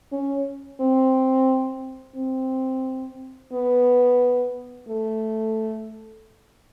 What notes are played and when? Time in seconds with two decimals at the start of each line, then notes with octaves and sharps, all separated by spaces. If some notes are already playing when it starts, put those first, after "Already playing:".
0.12 C#4
0.81 C4
2.16 C4
3.53 B3
4.88 A3